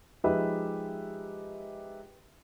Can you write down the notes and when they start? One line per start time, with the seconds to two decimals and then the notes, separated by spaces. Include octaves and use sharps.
0.24 F3 G#3 D#4 G4 B4 E5